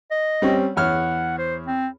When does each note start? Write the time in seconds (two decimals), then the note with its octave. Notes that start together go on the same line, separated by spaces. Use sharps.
0.11 D#5
0.42 G3 C4 C#4
0.77 E2 C#5 F#5 F6
1.38 C5
1.67 C4